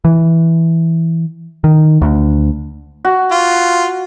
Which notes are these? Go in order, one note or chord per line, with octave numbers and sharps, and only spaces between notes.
E3
D#3
D2
F#4
F4